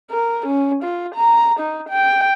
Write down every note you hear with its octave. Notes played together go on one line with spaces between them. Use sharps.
A#4
C#4
F4
A#5
D#4
G5